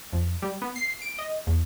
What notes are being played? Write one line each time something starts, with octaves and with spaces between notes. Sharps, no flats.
F2
G3
B3
C7
D7
D#5
E2